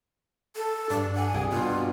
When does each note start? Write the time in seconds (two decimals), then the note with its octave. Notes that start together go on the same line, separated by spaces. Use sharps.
0.56 A4
0.90 G2 D4
1.16 F#5 G#5
1.34 C2 G4 G#4 D5
1.52 G2 B2 F4